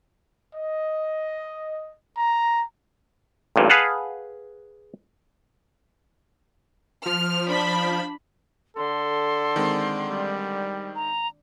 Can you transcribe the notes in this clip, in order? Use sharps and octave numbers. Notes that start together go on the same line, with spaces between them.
D#5
A#5
A1 G2 A#2
G#4 B4 F5 F#5 A5
F3 F6
D4 B5
D3 A4 C6
D#3 G#3 C4
G3
A#5